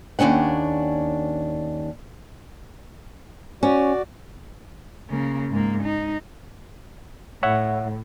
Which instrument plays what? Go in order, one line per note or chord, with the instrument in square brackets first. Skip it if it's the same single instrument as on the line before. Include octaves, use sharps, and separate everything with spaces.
[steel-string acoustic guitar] D#2 C#3 C#4 D4 F#5
[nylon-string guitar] C#4 [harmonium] F#4 D5
[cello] C#3 A#3
G#2 A#3
D#4
[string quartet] A2 [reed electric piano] C#5 E5 F#5